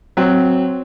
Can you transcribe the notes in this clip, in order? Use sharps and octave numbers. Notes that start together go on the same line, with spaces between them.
F#3 C4